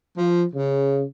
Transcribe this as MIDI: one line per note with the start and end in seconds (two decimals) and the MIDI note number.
0.18 0.44 53
0.54 1.03 49